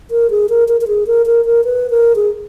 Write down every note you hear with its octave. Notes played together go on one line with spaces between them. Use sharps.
A#4
G#4
A#4
A#4
A#4
G#4
A#4
A#4
A#4
B4
A#4
G#4